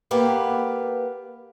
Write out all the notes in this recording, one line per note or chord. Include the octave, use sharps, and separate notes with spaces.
A#3 B3 G4 B4 F5